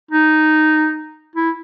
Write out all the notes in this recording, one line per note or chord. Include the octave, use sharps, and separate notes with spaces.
D#4
E4